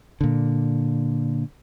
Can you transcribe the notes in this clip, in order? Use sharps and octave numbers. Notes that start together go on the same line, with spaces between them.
A#2 D3